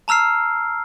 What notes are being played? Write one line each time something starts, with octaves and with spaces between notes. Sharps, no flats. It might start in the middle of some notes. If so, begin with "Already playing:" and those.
A5 A#5 E6 F6 C7